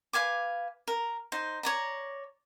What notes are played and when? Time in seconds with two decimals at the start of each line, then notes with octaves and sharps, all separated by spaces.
0.13 B4 F5 G#5 D6
0.88 A#4
1.32 D#4 C5
1.63 C#5 D5 A#5